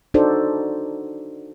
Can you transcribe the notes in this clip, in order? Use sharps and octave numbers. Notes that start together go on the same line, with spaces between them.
D4 D#4 F#4 A4 C5 D5